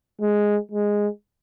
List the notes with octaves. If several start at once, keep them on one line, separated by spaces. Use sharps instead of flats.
G#3
G#3